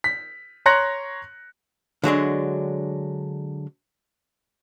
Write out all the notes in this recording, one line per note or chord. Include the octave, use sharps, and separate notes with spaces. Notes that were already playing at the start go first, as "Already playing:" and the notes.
B6
C#5 A#5 C6 F#6 A#6 C#7
D3 F#3 G#3 D4